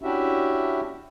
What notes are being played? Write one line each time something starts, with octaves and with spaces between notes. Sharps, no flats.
C#4 D4 E4 F#4 G4 E5